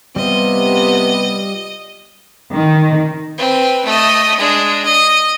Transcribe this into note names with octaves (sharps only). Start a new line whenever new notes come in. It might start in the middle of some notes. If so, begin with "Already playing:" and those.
C3 G3 B3 F4 D#5
D#3
C4 B4
A3 D#5
G#3 D4
D#5